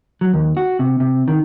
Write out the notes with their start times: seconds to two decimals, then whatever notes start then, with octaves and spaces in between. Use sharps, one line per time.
0.21 F#3
0.34 D#2
0.57 F#4
0.79 C3
1.00 C3
1.28 D#3